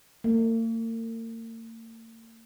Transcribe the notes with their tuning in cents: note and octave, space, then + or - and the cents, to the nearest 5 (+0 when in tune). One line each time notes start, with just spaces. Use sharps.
A#3 -45